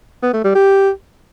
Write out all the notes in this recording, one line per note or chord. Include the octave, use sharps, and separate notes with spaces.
B3
A3
G3
G4